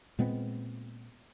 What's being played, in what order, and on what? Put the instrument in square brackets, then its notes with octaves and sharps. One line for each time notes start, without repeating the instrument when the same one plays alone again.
[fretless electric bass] A#2 G#3 B3 C4